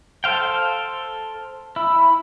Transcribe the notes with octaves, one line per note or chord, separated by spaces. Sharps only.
A4 C5 F5 G5
E4